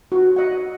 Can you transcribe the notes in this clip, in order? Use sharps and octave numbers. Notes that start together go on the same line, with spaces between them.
F#4
D#5 F#5